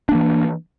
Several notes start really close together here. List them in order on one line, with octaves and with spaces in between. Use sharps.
D4 A#3 E3